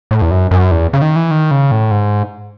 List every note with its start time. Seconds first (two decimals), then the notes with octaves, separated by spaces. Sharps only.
0.11 A2
0.22 E2
0.31 F#2
0.51 F#2
0.71 E2
0.93 C#3
1.02 D#3
1.16 E3
1.31 D#3
1.51 C#3
1.71 A2
1.91 G#2